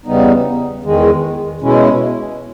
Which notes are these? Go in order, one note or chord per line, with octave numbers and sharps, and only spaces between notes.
E2 C#3 G3 B3 D#4
E2 D#3 G#3
B2 G#3 C#4 E4